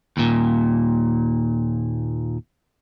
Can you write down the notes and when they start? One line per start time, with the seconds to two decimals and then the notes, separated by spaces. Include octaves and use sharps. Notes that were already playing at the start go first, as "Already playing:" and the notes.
0.17 D#2 A#2